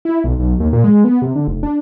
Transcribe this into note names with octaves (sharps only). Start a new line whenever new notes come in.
E4
B1
B1
D#2
A#2
G#3
B3
C3
D3
F1
D4